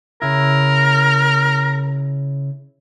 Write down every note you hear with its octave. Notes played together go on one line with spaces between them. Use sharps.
C#3 E4 A#4